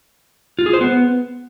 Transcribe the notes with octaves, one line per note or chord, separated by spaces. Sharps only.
F4
G#4
C5
B3